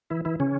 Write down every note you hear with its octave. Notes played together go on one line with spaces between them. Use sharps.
E3 E4
E3 E4
C#3 C#4